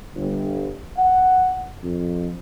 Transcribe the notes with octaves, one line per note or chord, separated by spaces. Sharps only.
G1
F#5
F2